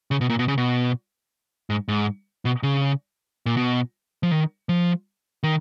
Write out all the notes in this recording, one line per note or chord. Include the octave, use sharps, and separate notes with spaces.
C#3
B2
A#2
B2
C#3
B2
G#2
G#2
B2
C#3
A#2
B2
F3
D#3
F3
D#3